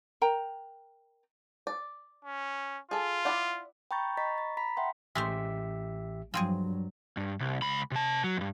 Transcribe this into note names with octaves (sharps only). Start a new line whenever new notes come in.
A#4 G5 A#5
D5
C#4
F4 G#4 A4
E4 D5 F#5
G5 A#5 B5 C#6 G6 A6
D#5 A#5 B5 C#6 A6 B6
A6
A#5 B5 B6
E5 F#5 G5 C6
A1 G#3 A3 G4 C5 E5
G2 F3 F#3 C4 G#4
G2
C2
C#2 B5
C3 A5
F#3
E2 G2